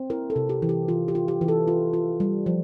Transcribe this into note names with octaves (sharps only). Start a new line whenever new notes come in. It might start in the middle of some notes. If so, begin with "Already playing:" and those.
Already playing: C4
E4 A#4
A4
C3
G4
E3
G4
E3 F4
G4
F4
G4
E3
A4
F4
F4
G3
F3